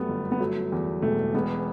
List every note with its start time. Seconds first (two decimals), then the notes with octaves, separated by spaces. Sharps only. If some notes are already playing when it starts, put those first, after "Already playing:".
Already playing: F#2 G3 A3 B3
0.09 G1
0.32 B3
0.40 F#3 A3
0.72 E2
1.02 E1 A3
1.34 E1 B3